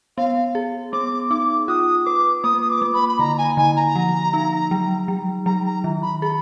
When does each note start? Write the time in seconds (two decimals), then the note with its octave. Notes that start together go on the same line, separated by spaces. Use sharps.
0.17 B3 F5
0.55 G#4
0.93 B3 D6
1.30 D#4 D6
1.68 F4 D#6
2.06 B4 D6
2.43 A#3 D#6
2.62 D#6
2.69 D6
2.82 A#3
2.94 B5
3.09 B5
3.19 D3 A#5
3.38 G#5
3.57 D3 G#5
3.76 A#5
3.96 F3
4.33 D#4
4.71 F#3
5.08 F#3
5.46 F#3 A#5
5.66 A#5
5.84 D#3
6.02 B5
6.22 G#4 B5